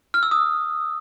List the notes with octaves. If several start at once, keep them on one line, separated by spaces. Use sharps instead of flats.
F6
E6
D#6